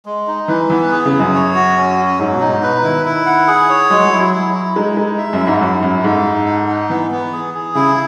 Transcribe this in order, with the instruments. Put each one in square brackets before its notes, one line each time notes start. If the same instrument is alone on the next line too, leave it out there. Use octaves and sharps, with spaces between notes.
[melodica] G#3
D#4
[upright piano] E3 [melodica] B4
[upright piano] E3 [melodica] B3
[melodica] G#4
[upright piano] C#3
[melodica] G#4
[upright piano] F#2
[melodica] C#5
F#4
C#4
C#4
[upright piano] G#2 [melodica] F#3
[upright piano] B2
[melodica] D#4
[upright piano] G#2
[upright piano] B2 [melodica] B4
[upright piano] D#3 [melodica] E4
[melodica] E4
F#5
G#4
C#5
[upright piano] F#3 [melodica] G#3
[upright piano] F#3
[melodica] E4
[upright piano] F#3
[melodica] E4
E4
[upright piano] G#3 [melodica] D#4
[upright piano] G#3 [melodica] D#4
[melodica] E5
[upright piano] F#2
[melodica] E4
[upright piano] G#2
[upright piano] F#2 [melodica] F#5
[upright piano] F#2 [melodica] E4
[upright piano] G#2 [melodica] A4
[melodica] D#4
F#5
D#4
[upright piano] E3 [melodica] B3
[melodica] B3
G#4
G#4
[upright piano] C#3 [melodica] E4